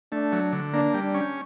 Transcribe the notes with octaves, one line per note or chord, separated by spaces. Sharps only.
A3 D4
F#3
D3
A#3 D4
G3
D4
C#4